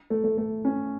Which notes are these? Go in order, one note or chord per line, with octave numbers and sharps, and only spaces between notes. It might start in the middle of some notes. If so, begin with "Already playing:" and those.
A3
A3
A3
C#4